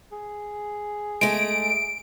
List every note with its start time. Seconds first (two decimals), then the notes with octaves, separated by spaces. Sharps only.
0.12 G#4
1.21 G#3 A3 D7